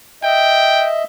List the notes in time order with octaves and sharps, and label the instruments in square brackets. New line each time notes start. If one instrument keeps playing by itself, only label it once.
[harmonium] D#5 E5 [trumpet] G5